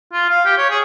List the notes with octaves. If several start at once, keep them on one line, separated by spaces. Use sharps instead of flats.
F4
F5
G4
C#5
G#4